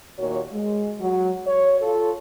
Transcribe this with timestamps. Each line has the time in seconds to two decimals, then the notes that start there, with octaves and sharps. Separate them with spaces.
0.18 D#2 A#2 A#3 F#4 C#5
0.52 G#3
1.00 F#3
1.47 C#5
1.82 F4 A4